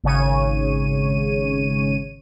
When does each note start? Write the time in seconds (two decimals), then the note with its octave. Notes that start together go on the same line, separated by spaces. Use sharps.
0.04 G#1 C#3 C#5 D#7